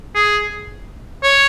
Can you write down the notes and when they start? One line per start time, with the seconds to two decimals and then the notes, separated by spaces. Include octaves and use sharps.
0.15 G#4
1.23 C#5